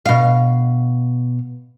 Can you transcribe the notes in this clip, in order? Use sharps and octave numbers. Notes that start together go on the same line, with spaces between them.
B2 F5